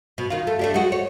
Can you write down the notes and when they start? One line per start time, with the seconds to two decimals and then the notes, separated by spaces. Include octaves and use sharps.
0.18 B2
0.30 D#3 F4
0.47 A3
0.59 A3 D4 G4
0.74 G#3 F#4
0.92 C#5